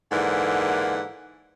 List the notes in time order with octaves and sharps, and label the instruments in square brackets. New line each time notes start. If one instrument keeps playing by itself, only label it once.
[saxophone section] G#2 D3 E3 A#3 F#5